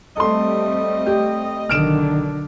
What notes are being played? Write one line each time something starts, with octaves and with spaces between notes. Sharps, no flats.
G3 A3 C4 A4 D#5 C6
G4
B1 D3 D#3 F6 D7 E7